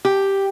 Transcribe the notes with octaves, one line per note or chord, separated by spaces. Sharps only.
G4